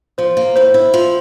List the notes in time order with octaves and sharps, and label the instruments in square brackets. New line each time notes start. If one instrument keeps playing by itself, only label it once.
[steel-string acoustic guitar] F3 [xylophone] C5
[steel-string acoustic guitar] A#3
[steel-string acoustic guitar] A2 [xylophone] C5
[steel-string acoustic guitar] E4
F3